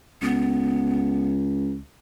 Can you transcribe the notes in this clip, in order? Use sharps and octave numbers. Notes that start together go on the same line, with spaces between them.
C#2 B3